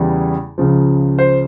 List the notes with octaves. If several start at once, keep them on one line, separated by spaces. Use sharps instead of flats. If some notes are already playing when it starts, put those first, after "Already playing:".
Already playing: E2 C#3 E3 G3
C#2 C#3 F3
C5